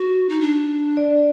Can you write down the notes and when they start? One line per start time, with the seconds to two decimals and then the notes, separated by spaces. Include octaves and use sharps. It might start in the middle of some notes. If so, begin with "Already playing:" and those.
Already playing: F#4
0.29 D#4
0.41 D4
0.97 D5